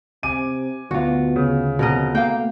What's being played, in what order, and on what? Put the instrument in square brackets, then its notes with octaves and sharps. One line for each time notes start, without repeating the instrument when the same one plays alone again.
[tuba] C3 [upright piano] G#5 D6 D#7
[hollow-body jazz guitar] D2 F4 [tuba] B2 [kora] F#4
[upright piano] C#3
[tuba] F2 [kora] B2 A#4 D#5
[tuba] A3 [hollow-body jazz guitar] A#3 F5 [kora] G5